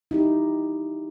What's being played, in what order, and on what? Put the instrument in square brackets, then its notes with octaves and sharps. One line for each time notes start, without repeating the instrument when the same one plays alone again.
[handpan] D#4 E4 G4